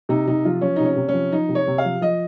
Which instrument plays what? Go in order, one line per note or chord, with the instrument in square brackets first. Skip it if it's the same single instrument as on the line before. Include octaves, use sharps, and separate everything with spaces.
[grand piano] C3 D#4
C3 D#4
F3 F4
F3 C#4
C3 D#4
C#4
C3
C#4
F3
F3 D#4
C3
C#5
C3
F5
F3
F3 D#5